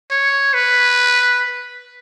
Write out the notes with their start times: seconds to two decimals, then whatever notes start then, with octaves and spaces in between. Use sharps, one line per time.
0.11 C#5
0.54 B4